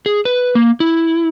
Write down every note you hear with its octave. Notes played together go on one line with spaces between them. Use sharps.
G#4
B4
A#3
E4